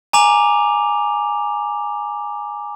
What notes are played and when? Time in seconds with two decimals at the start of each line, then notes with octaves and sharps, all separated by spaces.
0.13 G#5 A#5 D6 F7